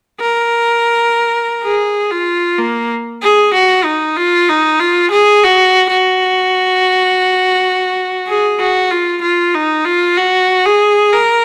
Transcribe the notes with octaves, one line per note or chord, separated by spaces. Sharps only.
A#4
G#4
F4
A#3
G#4
F#4
D#4
F4
D#4
F4
G#4
F#4
F#4
G#4
F#4
F4
F4
D#4
F4
F#4
G#4
A#4